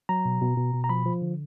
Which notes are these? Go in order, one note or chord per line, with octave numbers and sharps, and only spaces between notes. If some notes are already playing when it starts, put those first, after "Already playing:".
F#3 A#5
B2
B2
B2
B2
A#5
F3 B5
F3
D3